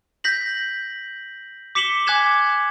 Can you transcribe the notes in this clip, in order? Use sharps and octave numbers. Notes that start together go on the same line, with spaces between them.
G6 A#6 B6 F#7
D6 B6 C#7 E7 F#7 G7
G#5 D6 F#6 G#6 B6 E7